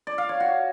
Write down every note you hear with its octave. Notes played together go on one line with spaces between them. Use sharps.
D5
F5
C#5
F#4